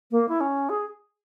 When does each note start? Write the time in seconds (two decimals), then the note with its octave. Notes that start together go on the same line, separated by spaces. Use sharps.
0.11 A#3
0.28 E4
0.40 C#4
0.69 G#4